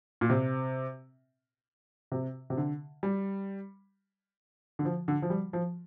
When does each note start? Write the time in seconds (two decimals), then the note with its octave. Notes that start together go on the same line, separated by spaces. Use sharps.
0.21 A#2
0.30 C3
2.12 C3
2.50 C3
2.57 D3
3.03 G3
4.79 D3
4.85 F3
5.08 D3
5.22 F3
5.30 G3
5.53 F3